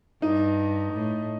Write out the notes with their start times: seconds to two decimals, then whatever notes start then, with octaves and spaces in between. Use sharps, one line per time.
0.22 G2 D#4
0.92 A2